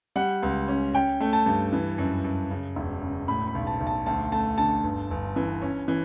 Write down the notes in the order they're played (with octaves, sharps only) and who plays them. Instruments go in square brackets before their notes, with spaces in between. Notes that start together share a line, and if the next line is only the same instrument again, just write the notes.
[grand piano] G3 F#5
C#2
C#4
C#4 G5
A3
A5
G2
E3
F#2
F#2
C#3
E1
C#3
A2 B5
B5
B1
A5
B1
A5
D2 A5
A3 A5
D3 A5
G1
G1
E3
C#4
E3